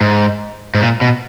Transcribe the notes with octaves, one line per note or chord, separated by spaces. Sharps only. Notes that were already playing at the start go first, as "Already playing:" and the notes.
G#2
G#2
A#2
B2